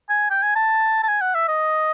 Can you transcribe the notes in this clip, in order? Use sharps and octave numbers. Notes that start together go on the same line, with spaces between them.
G#5
G5
G#5
A5
A5
G#5
F#5
E5
D#5